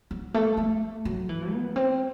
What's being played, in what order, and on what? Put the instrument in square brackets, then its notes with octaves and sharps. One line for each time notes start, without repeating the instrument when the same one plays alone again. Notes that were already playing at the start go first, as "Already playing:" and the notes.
[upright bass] F#3
A3
A3
F#3
E3
B3
C4